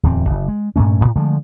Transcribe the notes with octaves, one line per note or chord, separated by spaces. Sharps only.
D1 E2 C4
F#1
G#3
G2 A#2 A3 C#4
F2 A2
D3 F3 G#3 A3